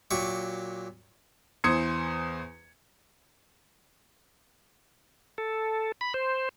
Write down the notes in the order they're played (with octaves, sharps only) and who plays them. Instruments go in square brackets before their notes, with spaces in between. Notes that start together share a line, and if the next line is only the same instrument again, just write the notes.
[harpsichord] A#2 F#3 G4 C#6
[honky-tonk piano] E2 E3 C5 D#6 G#6 C#7
[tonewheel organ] A4
B5
C5